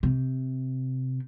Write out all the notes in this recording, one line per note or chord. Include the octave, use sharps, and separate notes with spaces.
C3